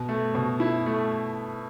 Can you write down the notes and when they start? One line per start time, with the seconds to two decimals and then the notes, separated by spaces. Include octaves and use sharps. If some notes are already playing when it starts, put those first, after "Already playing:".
Already playing: B2
0.09 A3
0.35 B2
0.60 E4
0.86 A3